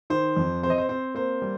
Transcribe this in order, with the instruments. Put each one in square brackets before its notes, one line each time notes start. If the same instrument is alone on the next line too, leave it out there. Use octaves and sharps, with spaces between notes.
[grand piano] D#3 C5
F2
C4 C5
D#5
C5
C4 C5
A#3 C5
G3